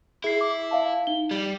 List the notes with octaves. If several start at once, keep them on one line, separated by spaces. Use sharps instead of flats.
E4 G#4 C7
D6
E5 F5 A5
D#4 G7
G3